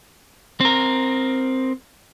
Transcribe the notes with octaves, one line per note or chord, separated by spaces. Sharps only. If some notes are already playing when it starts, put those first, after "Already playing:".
C4 A#4